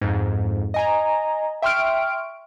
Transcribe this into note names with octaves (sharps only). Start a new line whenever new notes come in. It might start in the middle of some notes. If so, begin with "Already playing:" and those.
F2 G#2
D#5 G#5 A#5
E5 G5 C6 C#6 F6 D7